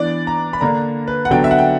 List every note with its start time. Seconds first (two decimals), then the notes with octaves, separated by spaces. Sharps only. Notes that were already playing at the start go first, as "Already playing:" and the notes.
Already playing: E3 B3 D4 D5
0.27 A#5
0.53 B5
0.61 D3 A#3 D4 A#5
1.08 B4
1.25 F#5
1.31 D3 F#3 B3 D4 G5
1.44 E5
1.51 F#5
1.59 G5